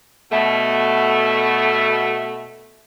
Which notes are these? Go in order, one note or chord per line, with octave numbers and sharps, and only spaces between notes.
B2 A3